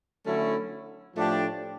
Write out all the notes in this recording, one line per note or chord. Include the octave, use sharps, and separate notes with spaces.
D3 F#3 A3 C#4 E4
A2 F3 A3 D4 G4